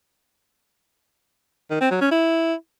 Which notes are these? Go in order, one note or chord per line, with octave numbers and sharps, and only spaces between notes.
D#3
C4
F#3
C#4
E4